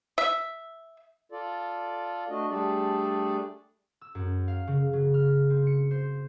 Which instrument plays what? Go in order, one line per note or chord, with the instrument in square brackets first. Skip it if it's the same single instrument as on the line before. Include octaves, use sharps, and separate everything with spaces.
[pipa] E5
[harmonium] F4 A4 D5
A3 D4 F#4 D#5
G3 A3 D4 G#4 A4 D5
[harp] E6
F#2
F5
C#3
F#3
F6
C4
C#7
C5